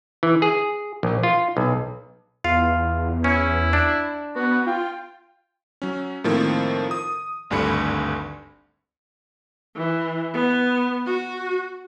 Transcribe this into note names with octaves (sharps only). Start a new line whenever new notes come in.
E3
G#4
A#1
F4
B1
E2 F4 F5
C#4 E4
D4
B3 F#4
F4 G5
F#3 C#4
A2 D#3 F3 A#3 C4
D#6
G#1 D2 G2 D3 B5 C#7
E3
B3
F#4